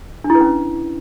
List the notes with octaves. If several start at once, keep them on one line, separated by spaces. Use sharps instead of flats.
D4
E4
B4
C#4